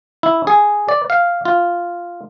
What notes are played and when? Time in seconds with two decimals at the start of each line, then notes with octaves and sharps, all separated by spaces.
0.23 E4
0.47 G#4
0.89 D5
1.10 F5
1.45 F4